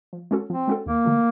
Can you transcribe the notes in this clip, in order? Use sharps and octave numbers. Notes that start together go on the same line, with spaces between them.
F3
G#3 C#4 F#4 A4
F3 C4
G#3 C#4 F#4 A4
D#2 A#3
D3 F3 A3